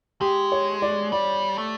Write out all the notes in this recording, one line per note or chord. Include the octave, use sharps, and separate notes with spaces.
G#3 G4
C#5
D5
G3 D5
A3